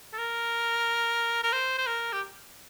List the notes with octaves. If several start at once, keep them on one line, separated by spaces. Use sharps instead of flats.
A4
A#4
A#4
C5
C5
A#4
G4